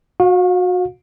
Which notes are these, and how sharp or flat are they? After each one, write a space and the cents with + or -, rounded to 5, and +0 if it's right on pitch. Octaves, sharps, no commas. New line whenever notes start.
F#4 -25 F5 +35